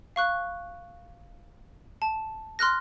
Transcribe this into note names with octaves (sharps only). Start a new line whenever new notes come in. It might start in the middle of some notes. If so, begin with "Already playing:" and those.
F5 C#6 F#6
A5
C6 F6 F#6 A#6